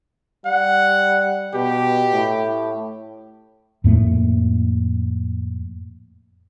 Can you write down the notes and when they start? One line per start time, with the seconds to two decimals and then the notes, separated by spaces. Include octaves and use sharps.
0.46 G3 F#5
1.54 B2 G4
2.12 A2
3.84 F2 A2 A3 A#3